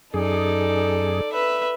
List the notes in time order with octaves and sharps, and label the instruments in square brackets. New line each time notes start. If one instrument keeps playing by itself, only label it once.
[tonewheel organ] F#2 G#4 [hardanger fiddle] D#4 [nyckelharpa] A4 D5
[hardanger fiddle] B4 [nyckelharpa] E5